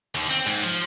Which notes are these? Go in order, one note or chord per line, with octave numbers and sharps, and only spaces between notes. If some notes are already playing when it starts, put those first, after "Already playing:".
D#2
C4
G#2
F3